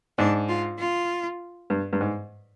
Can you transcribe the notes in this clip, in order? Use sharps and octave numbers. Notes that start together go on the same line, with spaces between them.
G#2 D4
F4
F4
G2
G2
G#2